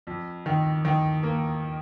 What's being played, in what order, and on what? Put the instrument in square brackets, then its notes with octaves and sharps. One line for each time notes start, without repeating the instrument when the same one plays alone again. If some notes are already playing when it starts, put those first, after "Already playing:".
[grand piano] F2
D#3
D#3
A#3